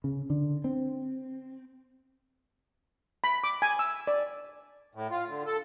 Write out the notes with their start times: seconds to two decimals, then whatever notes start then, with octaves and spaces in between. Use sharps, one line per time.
0.04 C#3
0.30 D3
0.64 C4
3.24 B5
3.44 D6
3.62 G#5
3.79 E6
4.07 D5
4.95 A2
5.11 F4
5.28 D3
5.46 A4